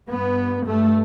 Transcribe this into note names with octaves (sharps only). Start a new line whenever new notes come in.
G2 B3
G2 A3